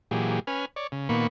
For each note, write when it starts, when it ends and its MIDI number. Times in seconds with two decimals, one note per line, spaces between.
0.11 0.40 46
0.11 0.40 52
0.11 0.40 54
0.11 0.40 67
0.11 0.40 68
0.47 0.65 61
0.47 0.65 71
0.47 0.65 80
0.47 0.65 89
0.76 0.87 73
0.76 0.87 74
0.92 1.08 49
1.09 1.27 46
1.09 1.27 51
1.09 1.27 58
1.09 1.27 59
1.09 1.27 83
1.09 1.27 85